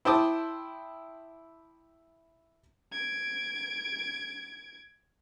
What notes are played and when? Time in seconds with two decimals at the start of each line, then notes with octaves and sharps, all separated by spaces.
0.05 E4 C5 G5 A5 D6 D#6
2.92 G#6 D7